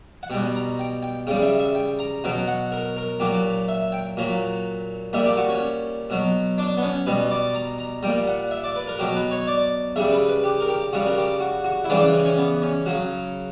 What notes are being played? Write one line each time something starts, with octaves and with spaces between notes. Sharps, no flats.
F#5
B2 G3 G5
A#5
G5
G5
C#3 G3 G5
E5
E5
G5
A#5
B2 F#3 G5
F#5
A#4
A#4
A#2 F#3 G4
E5
G5
A#2 F#3
A#2 G3 E5
G4
F#4
C#4
B2 F#3
D4
B3
C#4
B2 G3 B4
D5
A#5
A#5
A#2 G3 G5
F#5
E5
D5
B4
A#4
B2 F#3 G4
B4
C#5
D5
C#3 G3 E5
B4
B4
G4
A#4
G4
C#3 G3 F#4
A#4
G4
F#4
F#4
E4
C#3 E3 G3 D4
C#4
C#4
B3
C#4
C#3 F#3